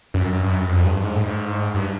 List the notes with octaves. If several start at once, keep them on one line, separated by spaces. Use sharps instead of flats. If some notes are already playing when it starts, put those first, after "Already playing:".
F#2
F#2
G2
F#2
F2
G2
G#2
A2
G#2
G2